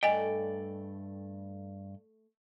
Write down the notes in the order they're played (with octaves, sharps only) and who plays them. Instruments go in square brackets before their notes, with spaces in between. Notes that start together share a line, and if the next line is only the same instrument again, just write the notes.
[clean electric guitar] G2 D5 G5 [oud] A3 A4 [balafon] D#5 G#5